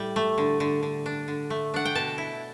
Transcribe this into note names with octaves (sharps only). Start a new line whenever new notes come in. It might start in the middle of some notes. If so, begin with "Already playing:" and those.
Already playing: A2 G3
A3
D3
D3
D3
D4
D3
A3
D4 F#5
G5
B2 A5
E4